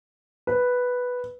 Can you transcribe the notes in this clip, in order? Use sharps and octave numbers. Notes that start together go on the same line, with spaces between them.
B4